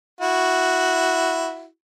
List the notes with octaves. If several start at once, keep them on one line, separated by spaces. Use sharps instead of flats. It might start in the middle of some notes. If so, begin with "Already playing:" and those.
E4 F#4